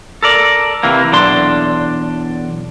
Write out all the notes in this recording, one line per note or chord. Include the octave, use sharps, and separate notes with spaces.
A4 A#4 D5
C3 E3 A#3
B1 E2 D4 C6